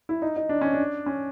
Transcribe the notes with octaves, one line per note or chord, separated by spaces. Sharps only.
E4
D#4
D#4
D4
C#4
D4
C#4